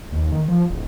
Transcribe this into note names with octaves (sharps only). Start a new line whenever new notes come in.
D#2
D#3
F3
D1